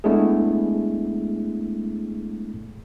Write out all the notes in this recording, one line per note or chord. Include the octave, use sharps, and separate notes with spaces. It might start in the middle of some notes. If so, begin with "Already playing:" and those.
G#3 A3 B3 D4 E4 G#4